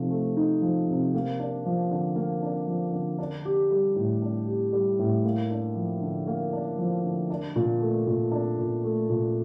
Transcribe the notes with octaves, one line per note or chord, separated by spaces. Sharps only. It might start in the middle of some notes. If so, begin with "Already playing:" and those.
Already playing: C3 F3 A3 D#4
A3
D#4
F3
C3
A#3
D4
F3
D3
A#3
D4
F3
D3
D4
G4
G3
A2
D4
G4
G3
A2
A#3
D4
F3
D3
A#3
D4
F3
D3
D4
A#2
A3
A#2
D4
A#2
A3
A#2